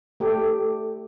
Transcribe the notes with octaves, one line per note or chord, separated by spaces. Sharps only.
A3 G4 A4